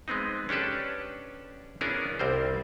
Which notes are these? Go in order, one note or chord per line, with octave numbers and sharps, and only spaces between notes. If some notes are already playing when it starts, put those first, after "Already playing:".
G#3 B3 C4 D#4
C#4 D4 G4 A4 B4
B3 C#4 D4 E4 G#4 A#4
C2 G3 C4 C5